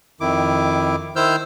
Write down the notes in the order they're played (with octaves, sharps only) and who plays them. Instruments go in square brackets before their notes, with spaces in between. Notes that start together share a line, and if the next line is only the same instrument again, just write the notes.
[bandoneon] F2 D#3 E4 D6
D#3 E4 C5 E6 F6 G6